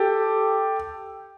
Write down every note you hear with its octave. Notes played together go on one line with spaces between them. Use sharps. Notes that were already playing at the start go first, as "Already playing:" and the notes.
Already playing: G4 A4